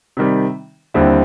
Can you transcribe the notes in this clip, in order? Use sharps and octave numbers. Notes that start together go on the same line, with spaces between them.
C3 D#3 G3
D#2 D3 G3 C4 E4